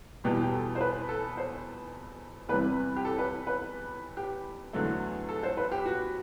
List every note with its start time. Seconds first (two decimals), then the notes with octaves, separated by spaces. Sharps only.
0.24 E2 B2 G3 G4
0.42 G4
0.52 A4
0.75 C5
0.81 B4
1.09 A4
1.37 C5
2.49 E2 C3 G3 B4
2.97 G4
3.05 A4
3.19 B4
3.47 B4
4.17 G4
4.73 E2 D3 F#3 A3
5.29 A4
5.43 C5
5.57 B4
5.72 G4
5.86 F#4